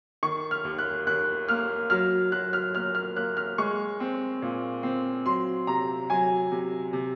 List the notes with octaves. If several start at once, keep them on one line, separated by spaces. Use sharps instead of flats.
D#3 C#6
F6
D#2
F#6
D#2 F#6
A#3 F6
F#3 F6
F#3 F#6
F6
A#3 F6
F6
A#3 F#6
F6
G#3 C#6
C4
A#2
C4
F#3 C6
C3 A#5
F#3 G#5
C3
C3